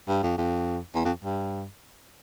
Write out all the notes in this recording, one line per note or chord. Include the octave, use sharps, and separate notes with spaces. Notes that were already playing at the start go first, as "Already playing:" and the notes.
G2
F2
F2
E2
F2
G2